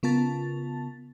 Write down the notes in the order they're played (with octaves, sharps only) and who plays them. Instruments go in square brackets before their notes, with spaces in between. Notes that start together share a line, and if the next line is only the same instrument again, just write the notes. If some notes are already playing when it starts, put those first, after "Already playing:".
[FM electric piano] C#3 B3 F4 A#4 A5 A6